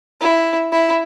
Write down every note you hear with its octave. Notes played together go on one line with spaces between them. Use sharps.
E4
E4